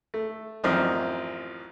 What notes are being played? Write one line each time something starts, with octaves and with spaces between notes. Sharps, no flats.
A3
A1 F#2 F3 C4 D5 D#5